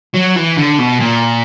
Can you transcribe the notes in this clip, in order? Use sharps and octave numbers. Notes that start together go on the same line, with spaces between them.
F#3
E3
D3
B2
A#2